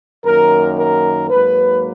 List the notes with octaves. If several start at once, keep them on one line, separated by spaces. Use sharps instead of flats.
F#2 D#3 A#3 A#4
A#4
G#2 F#3 A#3 B4